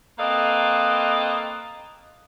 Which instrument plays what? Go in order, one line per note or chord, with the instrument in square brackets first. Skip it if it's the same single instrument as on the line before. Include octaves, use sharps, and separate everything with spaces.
[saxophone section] A#3 C4 A4 B4 D#5 F5